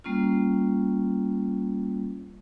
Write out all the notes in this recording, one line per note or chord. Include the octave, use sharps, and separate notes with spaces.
G3 A#3 C#4 F4